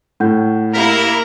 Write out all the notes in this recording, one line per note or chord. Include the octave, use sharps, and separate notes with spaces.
A2 F#5 G6
A#3 E4 G4 A#4 B6